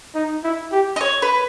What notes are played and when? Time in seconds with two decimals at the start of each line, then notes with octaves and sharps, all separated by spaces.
0.15 D#4
0.44 E4
0.72 G4
0.96 D#5
1.01 C#5
1.22 B4